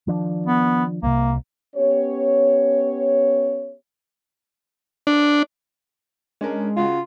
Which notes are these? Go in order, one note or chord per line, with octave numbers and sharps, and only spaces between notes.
D#3 F3 D4
B3
C2 C3 A#3
B3 C#4 G4 C#5
D4
G#3 C#4 D4 A#4
C#3 F4 F#4